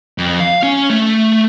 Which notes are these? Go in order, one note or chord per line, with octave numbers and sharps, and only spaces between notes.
F2
F5
C#4
A3